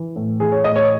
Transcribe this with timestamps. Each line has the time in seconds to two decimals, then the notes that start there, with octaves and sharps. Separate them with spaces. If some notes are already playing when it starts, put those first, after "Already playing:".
Already playing: E3
0.16 A2
0.40 E3 G#4
0.52 C#5
0.64 A2 D#5
0.76 C#5